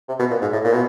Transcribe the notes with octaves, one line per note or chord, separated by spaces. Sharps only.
C3
B2
A#2
G#2
A2
A#2
B2